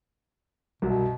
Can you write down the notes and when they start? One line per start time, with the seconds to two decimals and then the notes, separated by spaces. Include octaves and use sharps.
0.82 C2 F#2 B2 F#3